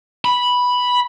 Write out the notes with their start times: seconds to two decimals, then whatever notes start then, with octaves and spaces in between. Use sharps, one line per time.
0.25 B5